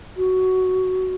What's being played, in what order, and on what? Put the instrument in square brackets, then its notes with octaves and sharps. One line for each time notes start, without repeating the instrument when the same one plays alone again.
[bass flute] F#4